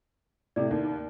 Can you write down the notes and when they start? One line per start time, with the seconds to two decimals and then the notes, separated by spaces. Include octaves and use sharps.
0.56 A2 C3 D5
0.71 D#2